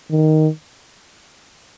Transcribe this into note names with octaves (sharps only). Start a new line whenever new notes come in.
D#3